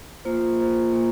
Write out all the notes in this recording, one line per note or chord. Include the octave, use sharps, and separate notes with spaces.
A#3 F4 C5
A#3 F4 C5
A#3 F4 C5